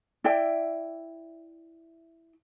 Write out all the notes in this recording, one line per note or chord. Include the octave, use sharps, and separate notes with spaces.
E4 D5 E5 G5